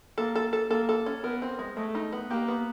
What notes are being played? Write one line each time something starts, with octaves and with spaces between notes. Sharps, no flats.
A#3 A4
A4
A4
A#3 A4
A4
C#4
B3 A#4
C4
G#3
G#3 A3
D#4
B3
A#3 G4
B3